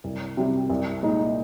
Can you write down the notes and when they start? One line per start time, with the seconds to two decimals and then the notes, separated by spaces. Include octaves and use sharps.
0.04 C2
0.37 C3 G3
0.70 C2
1.03 A#2 G#3 D#4